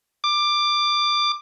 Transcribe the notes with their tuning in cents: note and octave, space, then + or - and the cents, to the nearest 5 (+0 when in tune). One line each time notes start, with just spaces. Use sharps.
D6 +15